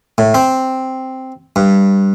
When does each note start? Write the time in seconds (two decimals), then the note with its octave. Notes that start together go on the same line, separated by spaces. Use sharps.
0.18 A2
0.34 C4
1.56 G2